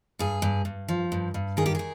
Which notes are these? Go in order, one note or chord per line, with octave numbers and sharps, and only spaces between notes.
G2 G#4
G2
G2
F3
G2
G2
D#3 G#4
G4
D#3 G#4